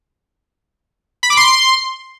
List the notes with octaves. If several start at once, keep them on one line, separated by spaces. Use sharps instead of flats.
B5
D6
C6